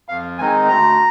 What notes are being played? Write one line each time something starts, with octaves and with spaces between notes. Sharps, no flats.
F2 F5
D#3 G#3 C4 D#4 G#5
D2 A#5